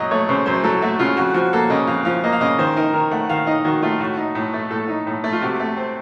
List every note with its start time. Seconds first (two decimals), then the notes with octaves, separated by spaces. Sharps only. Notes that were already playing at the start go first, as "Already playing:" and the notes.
Already playing: F#2 F#3 D#5 F#5
0.11 A3 C#5
0.29 C#3 C5
0.46 F#2 C5
0.64 F#3 A4
0.82 A3 F#4
0.99 C#3 F4
1.17 F2 F#4
1.34 F3 F#4
1.53 A#3 A4
1.70 C#3 D#5
1.87 F2 F5
2.05 F3 F5
2.24 A#3 D#5
2.33 F5
2.41 C#3 D#5
2.58 D#3 C5
2.76 D#4 A#4
2.93 D#3 A#4
3.11 A3 F#5
3.29 D#3 F5
3.47 D#4 D#5
3.65 D#3 F#4
3.82 A3 F4
4.00 A2 F#4
4.17 D#4
4.35 A2
4.54 A3
4.71 A2 A4
4.88 D#4
5.07 A2
5.24 A3
5.32 F4
5.42 C3 F#4
5.60 A3
5.77 C4